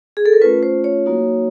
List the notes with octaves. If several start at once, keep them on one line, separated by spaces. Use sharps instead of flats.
G#4
A4
A#4
A3 C#4 F4 B4
C5
C#5
F#3 A#3 D#4 F#4